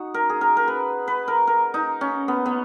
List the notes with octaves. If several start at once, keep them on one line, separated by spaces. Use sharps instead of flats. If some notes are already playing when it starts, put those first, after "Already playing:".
Already playing: D#4 F#4
A#4
G#4
A#4
A#4
B4
B4
A#4
A#4
D#4
C#4
B3
B3